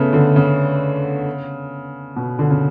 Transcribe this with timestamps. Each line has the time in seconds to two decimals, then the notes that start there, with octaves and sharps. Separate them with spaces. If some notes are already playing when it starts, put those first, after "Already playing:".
Already playing: C#3 A3 B3
0.13 D3
0.36 C#3
2.16 B2
2.39 D3
2.50 C#3